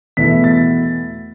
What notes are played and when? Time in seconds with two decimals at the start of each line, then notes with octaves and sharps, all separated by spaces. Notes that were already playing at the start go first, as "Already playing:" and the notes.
0.17 E2 B2 A3 E4 B6
0.44 A6